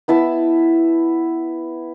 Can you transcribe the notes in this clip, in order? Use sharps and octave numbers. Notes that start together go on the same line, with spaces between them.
B3 E4 A5 E6